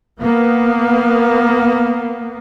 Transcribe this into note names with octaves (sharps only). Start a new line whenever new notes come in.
A#3 B3